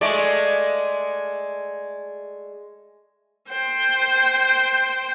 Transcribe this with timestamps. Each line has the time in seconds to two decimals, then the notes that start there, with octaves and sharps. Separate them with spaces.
0.01 G#3 A3 D5
3.49 C5 G5